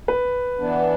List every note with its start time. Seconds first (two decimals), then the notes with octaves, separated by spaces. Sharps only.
0.08 B4
0.59 E3 B3 D4